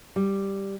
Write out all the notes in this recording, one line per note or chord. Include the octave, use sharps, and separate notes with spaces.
G3